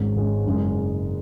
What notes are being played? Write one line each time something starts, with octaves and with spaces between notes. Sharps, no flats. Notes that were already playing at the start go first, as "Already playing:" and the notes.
Already playing: G#1 G#2 G#3 C#4
G#1 G#2 G#3 C#4
F#1 F#2 C#3 G#3